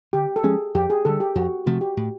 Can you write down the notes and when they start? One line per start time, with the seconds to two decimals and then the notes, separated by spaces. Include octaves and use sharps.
0.13 D3 G4
0.36 A4
0.43 F3 G#3 C#4 G#4
0.74 F2 G4
0.90 G#4
1.05 D3 G3 A4
1.20 G4
1.35 F2 F#4
1.66 C3 F3 A3 F#4
1.81 G4
1.97 A2